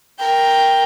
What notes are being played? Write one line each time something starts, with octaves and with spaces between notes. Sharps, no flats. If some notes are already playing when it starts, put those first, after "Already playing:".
A#4 G5